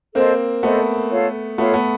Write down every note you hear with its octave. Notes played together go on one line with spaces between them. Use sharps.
A#3 C4 A4 C5 D#5
A3 B3 A4 C5 D#5
F4 A4 C#5 F5
A3 B3 F4 A4 C#5 F5
A3 B3